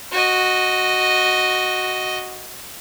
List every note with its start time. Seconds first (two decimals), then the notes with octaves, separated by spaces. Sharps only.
0.12 F#4 D#5